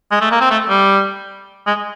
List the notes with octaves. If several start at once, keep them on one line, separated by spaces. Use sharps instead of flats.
G#3
A3
A#3
C4
A3
G3
G#3